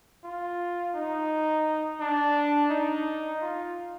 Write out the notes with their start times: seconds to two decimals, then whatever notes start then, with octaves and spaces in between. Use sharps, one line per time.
0.24 F4
0.95 D#4
2.01 D4
2.70 D#4
3.42 F4